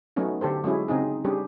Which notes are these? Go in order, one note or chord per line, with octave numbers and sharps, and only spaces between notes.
F#3 A3 B3 C#4 D#4
D3 G4 A4 C5
F#3 G#3 C#4 E4 G#4
C#3 C4 D#4 G#4
G3 C#4 D4 G4 G#4